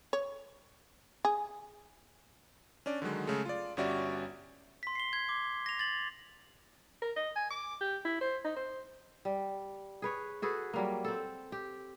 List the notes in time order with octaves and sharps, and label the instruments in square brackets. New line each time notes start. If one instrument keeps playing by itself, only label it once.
[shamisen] C#5
G#4
[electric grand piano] C#4 D4 D5
D3 D#3 F#3 G#3
C#3 G#3 A3
F4 D5
G1 G3 C#4 F#4 D5 E5
[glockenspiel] C6 B6
C7 G7
G#6
D6
A#6 F7
A6 F#7
[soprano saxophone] A#4
D#5
G#5
D6
G4
E4
C5
D#4
C5
[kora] G3
G#4 B4 C#5
F#4 G#4 A4 B4
F#3 G3 A#3
C4 A4
G4